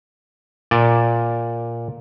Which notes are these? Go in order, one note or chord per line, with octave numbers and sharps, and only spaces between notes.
A#2 D5